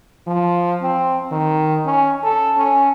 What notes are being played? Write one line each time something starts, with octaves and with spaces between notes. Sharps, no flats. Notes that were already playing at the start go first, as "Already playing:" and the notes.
F3
C4
D#3
C#4
A4
C#4